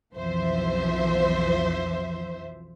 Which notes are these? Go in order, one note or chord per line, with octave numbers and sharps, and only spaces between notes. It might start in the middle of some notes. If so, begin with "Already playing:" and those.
B1 F2 E3 F3 C5 E5